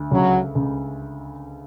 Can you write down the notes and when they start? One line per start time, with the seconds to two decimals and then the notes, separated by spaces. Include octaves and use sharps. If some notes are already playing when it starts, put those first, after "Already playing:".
Already playing: D2
0.11 C#2 F#3
0.55 C#2